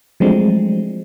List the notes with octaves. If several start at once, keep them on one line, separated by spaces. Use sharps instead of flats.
F3 F#3 G#3 A3 C4 D4